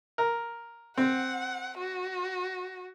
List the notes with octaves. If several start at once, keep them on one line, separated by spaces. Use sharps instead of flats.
A#4
C4 F#5
F#4